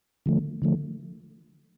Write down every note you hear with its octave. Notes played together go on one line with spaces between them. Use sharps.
D3 F3 A3
D3 F3 A3